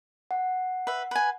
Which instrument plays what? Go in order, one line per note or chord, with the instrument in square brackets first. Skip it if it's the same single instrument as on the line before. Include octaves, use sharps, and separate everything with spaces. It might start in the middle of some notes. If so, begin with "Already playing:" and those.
[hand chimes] F#5
[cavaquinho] B4 E5
B4 G#5